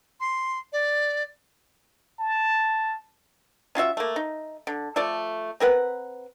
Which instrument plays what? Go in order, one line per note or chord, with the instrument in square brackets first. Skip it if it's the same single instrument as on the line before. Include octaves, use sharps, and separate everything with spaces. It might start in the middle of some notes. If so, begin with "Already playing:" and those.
[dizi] C6
D5
[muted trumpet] A5
[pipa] C#4 F4 F#4 E5
A3 A#3
D#4
D3
F3 A3 A4 D5
C4 A#4 B4 F#5